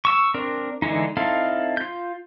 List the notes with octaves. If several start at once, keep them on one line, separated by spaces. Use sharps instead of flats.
C#6 E6
C4 D4 A#4
D3 E3 G#3 D#4
C4 D#4 E4 A4 F5
F4 G6